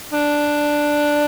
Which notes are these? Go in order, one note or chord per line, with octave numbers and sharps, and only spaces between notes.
D4